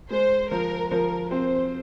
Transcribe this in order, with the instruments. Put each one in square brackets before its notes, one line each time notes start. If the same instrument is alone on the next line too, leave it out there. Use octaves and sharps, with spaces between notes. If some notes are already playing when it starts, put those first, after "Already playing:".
[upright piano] G#3 [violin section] C5
[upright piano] F3 [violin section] A#4
[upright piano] F3 [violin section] A#4
[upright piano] C4 [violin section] C5